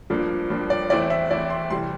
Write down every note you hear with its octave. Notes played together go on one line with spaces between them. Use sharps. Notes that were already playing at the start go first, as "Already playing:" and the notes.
G2 F3 A#3 D4
G2 F3 A#3 D4
D5
E2 E3 A3 C4 E4 D5
E5
E2 E3 A3 C4 E4 D5
C6
C3 E3 G3 C6